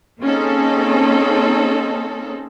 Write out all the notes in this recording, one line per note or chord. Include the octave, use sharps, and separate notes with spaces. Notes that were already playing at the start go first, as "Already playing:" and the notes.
A#3 C4 C#4 D#4 G#4 A4